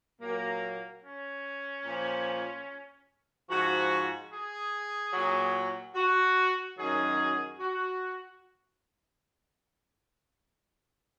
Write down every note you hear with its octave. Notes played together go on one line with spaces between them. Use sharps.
A#2 F#3 A#3
C#4
A#2 F3
G#2 F3 F#4
G#4
A#2 F#3
F#4
F#2 D#3 F#3 G#4
F#4